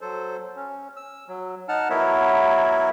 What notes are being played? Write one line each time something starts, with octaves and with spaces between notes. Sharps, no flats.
F#3 A4 C5
C#4
E6
F#3
D#4 F#5 A5 F6
F#3 B3 E4 A#4 C#5 E5